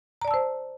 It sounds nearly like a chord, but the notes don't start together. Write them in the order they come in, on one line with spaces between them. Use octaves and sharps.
A#5 D5 A5 E6 C5